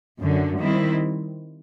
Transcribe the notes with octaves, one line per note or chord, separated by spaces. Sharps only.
F#2 D3 F#3
D#3 G3 C4 E4